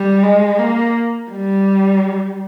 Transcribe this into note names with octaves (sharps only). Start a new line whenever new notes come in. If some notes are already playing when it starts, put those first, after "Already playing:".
Already playing: G3
G#3
A#3
G3